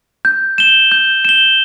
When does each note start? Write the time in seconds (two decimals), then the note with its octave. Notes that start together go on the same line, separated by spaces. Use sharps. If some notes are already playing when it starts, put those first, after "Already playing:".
0.25 G6
0.58 E7 G7
0.92 G6
1.25 E7 G7